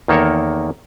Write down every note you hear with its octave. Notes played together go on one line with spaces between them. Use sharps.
E2 D#3 A#3 A4 A#4 C#5